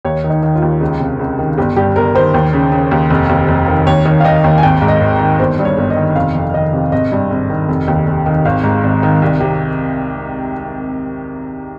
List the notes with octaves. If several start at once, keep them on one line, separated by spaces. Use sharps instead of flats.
D#2 C#5
D#3
D#4
D#3
F4
D#2
C#2
C3
C#2
D#3
G1 G4
G2 G4
G1 A#4
D#3 C5
D#2
C#3
C#3
D#2
F1
D#2
F1
D#3
D#2 C#5
D#3 C#5
F5
D#3 D#5
D#2
G#5
G#1 G5
G#2
D#5
G#1
D#3
G1 C5
G2
C#5
G1
D#5
D#3
F1 F5
F2
D#3 D#5
C3
G#1 D#5
G2
G#1
D#3
F1
D#2
F1
D#3
G#1 F5
G#2
G#1
D#3
C2
C3